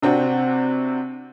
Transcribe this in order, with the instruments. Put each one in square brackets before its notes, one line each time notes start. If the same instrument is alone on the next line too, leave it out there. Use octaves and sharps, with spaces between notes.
[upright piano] C3 C4 D4 F#4